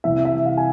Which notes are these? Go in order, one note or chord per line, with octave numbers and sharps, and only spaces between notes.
C2 C3 E3 E5
E5
F5
G#5